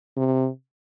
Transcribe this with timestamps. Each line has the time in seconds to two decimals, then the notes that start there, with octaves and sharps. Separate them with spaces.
0.17 C3